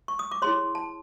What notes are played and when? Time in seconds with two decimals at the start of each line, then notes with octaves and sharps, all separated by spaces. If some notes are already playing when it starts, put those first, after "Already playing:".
0.08 C#6
0.19 D#6
0.31 D6
0.42 E4 G#4 C#5 C6
0.75 A5